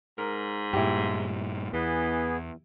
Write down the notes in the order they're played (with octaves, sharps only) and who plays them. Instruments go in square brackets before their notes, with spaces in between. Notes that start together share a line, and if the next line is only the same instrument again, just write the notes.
[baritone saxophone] G#2 [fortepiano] A#4
[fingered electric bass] G2 A#2 [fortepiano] E4 G4
[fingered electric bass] E2 [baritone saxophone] E3 [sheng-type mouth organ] B3 G#4